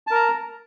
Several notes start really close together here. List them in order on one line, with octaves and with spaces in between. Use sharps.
A5 A#4 A#5